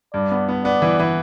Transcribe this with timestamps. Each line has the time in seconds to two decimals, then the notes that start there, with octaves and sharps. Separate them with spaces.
0.14 G2 D5
0.31 B3
0.48 B3
0.65 B3 D5
0.82 E3
0.99 E3